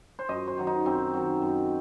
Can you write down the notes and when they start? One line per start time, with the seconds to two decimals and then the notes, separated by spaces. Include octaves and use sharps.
0.19 C5
0.29 F#2 D#5
0.48 C5
0.58 D#3 F#3
0.67 D#4
0.86 F#2 C4
1.14 D#3 F#3
1.42 F#2